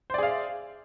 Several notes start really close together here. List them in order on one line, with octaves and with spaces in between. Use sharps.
C5 D5 G#4 F5 E5